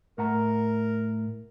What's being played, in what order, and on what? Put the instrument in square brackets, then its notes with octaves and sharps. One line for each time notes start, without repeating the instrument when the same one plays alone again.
[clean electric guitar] A2 F#5 A#5 [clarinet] A#4